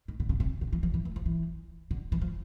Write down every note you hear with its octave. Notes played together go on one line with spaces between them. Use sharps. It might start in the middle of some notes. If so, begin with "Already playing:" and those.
D#3
D3
C#3
C3
D3
E3
F3
E3
E3
F3
E3
D3
E3
F3